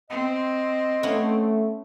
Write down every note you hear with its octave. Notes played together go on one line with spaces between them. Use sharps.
C4 D#5
A3 B3 C#4 E4